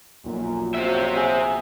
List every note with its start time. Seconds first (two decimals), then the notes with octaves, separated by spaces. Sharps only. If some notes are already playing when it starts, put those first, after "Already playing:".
0.24 B1 F#2 A#2 F3
0.75 F2 F#3 C4 F#4 E5
1.17 G#4